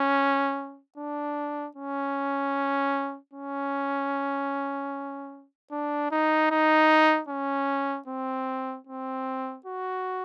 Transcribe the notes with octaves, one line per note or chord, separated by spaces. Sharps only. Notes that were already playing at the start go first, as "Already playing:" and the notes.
Already playing: C#4
D4
C#4
C#4
D4
D#4
D#4
C#4
C4
C4
F#4